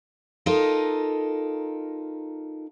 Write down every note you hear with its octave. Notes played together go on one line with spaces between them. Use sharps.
D#4 F4 A4 A#4 D#5